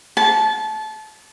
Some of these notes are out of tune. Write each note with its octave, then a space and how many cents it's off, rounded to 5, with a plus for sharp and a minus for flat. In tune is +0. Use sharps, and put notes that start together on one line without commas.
A5 -25